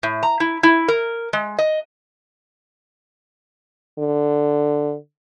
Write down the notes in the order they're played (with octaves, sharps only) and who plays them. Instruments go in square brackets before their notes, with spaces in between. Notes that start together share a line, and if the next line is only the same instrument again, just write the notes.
[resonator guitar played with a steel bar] A2
A#5
E4
E4
A#4
G#3
D#5
[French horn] D3